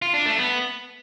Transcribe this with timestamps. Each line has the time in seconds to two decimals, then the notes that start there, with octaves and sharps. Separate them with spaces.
0.02 F4
0.14 D4
0.26 A3
0.38 B3